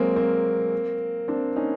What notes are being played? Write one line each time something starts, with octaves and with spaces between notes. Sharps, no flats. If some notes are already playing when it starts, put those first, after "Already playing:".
Already playing: F#3 G#3 A#3 C4
A#3 C4
C4 D4
C#4 D#4